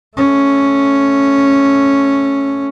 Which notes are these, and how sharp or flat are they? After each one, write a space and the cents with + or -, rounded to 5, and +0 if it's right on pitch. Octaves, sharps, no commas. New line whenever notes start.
A3 +0 C#4 +0